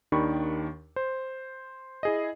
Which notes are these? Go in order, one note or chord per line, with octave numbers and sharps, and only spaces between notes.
D#2 D#3 D4 G4 B5 C#6
C5
E4 G#4 D#5